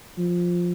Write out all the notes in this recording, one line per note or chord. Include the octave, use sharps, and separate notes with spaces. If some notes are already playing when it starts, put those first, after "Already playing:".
F3